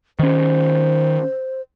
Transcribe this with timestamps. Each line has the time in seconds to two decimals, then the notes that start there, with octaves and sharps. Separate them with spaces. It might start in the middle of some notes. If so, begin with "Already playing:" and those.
0.19 D#3 C#4 C5